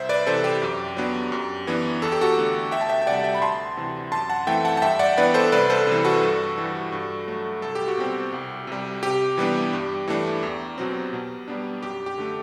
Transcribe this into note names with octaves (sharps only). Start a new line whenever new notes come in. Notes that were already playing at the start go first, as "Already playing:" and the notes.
Already playing: C2 C5 E5
B4 D5
C3 E3 A4 C5
G4
F#2
F#3 B3 D4
F#2
E3 B3 D4
E2 A4
G4
F#4 A4
D3 A3
D2 E5 G5
A5
E5 G5
G5
C3 G3 D5 F#5
E5 G5
B5
D2 A5 C6
C3 E3
F#2 A5 C6
F#5 A5
E3 A3 C4 E5 G5
F#5 A5
A5
G2 E5 G5
D5 F#5
E3 B3 D4 B4 D5
A4 C5
C2 B4 D5
A4 C5
C3 E3
F#4 A4
G2
E3 G3
G2
F#3 A3
C2 A4
G4
F#4
B2 G3 C4 G4
C2
C3 G3
C3 G4
E3 G3 B3 D4
G2
E3 A3 D4
E2
B2 F#3 C4
B2
G3 B3 D4
F#2 G4
G4
D3 A3